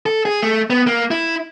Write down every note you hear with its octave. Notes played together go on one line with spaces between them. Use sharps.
A4
G#4
A3
B3
A#3
E4